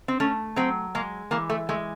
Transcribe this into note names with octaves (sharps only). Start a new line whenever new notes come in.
C4
A3 C#4
F#3 C4
G#3 A#3
E3 A#3
A3
G#3 A3